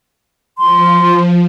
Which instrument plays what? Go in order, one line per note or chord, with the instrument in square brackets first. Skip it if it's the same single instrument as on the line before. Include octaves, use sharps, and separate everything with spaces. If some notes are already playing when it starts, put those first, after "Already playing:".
[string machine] F3 [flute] C6